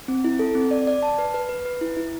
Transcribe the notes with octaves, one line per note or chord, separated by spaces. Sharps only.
C4
E4
A4
C4
D5
D5
A5
B4
B4
B4
B4
E4
E4